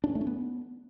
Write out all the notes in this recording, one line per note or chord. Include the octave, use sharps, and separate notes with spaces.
D4
C#4
A3
C#4
B3